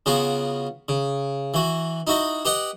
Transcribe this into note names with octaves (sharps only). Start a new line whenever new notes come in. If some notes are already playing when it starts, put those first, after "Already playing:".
C#3 B3 F4 F#4
C#3
E3 F#4
D#4 E4 F#4 D#5
G4 B4 D#5 F#5